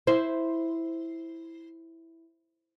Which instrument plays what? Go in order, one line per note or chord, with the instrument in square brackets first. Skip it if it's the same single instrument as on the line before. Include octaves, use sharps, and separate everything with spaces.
[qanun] E4 [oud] C5